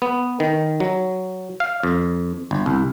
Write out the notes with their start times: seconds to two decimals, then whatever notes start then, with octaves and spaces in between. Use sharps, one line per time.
0.02 B3
0.40 D#3
0.80 F#3
1.60 F5
1.83 F2
2.51 G1
2.66 C2